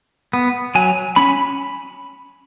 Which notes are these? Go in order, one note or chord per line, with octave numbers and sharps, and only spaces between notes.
B3
F#3 G#5
C#4 B5